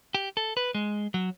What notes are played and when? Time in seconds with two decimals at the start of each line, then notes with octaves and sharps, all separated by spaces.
0.15 G4
0.37 A4
0.57 B4
0.75 G#3
1.14 F#3